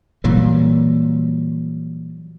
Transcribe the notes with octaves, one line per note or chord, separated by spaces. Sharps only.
A#2 E3 F#3 G3